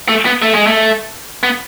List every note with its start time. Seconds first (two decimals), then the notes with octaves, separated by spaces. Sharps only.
0.08 A3
0.26 B3
0.42 A3
0.55 G#3
0.67 A3
1.43 B3